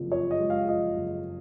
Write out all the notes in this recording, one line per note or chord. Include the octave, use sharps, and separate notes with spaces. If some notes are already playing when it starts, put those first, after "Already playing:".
Already playing: F#1 F2 F3
F3 C#5
D#5
G#3
F5
F3 D#5
F#1